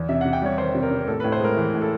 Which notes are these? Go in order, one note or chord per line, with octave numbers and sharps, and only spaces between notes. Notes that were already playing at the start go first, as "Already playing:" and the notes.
Already playing: E2
C3 E5
F#5
C3
G5
G3 C#5
D#3 C5
C3
A#4
C3
A#4
A2 A4
B4
A2
C5
G#3 A#4
E3
A2
A4